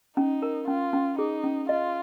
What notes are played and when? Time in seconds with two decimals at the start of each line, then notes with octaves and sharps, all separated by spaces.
0.17 C#4 D#4
0.42 A#4
0.68 C#4 F4
0.93 C#4
1.18 D#4 G#4
1.44 C#4
1.69 F4 D#5